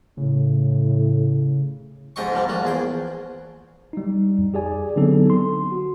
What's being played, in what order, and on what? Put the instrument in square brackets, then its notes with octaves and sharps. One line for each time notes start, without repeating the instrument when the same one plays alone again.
[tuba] A2 [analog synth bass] C#3
[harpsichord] F2 G#2 G4 D#5 G5 C#6
G#2 C3 F3 G3
A#2 F3 F#4
E2 G#4 G5
[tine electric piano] G3 D#4
F2
G4 G#4 D5 G#5
D3 F#3 B3 C4 D#4 A4
C6
F#4